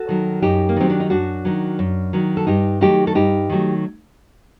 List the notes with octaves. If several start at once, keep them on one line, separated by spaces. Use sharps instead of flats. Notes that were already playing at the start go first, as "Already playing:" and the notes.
Already playing: F#4 A4
D#3 F#3
F#2 D#4 G4
A#3
D#3 F#3 C4
D4
D#4
F#2 D4 F#4
D#3 F#3
F#2
D#3 F#3
A4
G2 D#4 G4
D#3 F#3 A3 D#4 G4
A4
G2 D#4 G4
D#3 F#3 A3